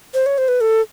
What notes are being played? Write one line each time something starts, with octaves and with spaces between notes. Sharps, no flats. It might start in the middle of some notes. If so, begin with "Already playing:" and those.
C5
C#5
C5
B4
A4